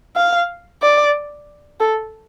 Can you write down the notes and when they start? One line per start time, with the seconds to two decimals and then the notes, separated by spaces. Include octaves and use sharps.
0.16 F5
0.82 D5
1.80 A4